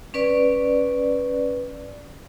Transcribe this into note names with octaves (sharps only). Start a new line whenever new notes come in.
C#4 B4 D5